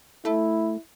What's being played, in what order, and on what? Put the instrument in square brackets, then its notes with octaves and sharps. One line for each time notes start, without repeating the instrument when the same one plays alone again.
[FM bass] A3 [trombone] E4